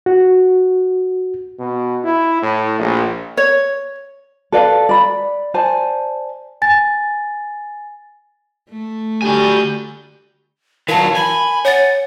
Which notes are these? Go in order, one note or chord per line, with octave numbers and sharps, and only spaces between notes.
F#4
B2
E4
A2
A#1
C#5
A4 B4 D5 F5
D5 B5
C5 D5 G#5 A5
G#5 A6
A3
D3 G3 F#4 G4 G#5 G6
E3 F#3 A#4 F5 A5
G#5 B5
C#5 F#5 A6